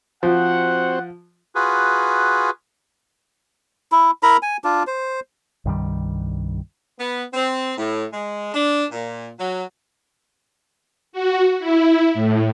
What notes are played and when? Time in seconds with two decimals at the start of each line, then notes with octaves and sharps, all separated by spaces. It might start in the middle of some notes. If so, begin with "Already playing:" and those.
0.23 F3 C4 F#4 C5 F#5
1.55 F4 F#4 G#4 B4
3.92 E4
4.23 E4 A#4 A#5 B5
4.42 G#5
4.64 D4 F4
4.87 C5
5.65 C2 G2 D#3 G3
6.98 B3
7.34 C4
7.78 A2
8.12 G#3
8.54 D4
8.91 A#2
9.38 F#3
11.13 F#4
11.59 E4
12.14 A2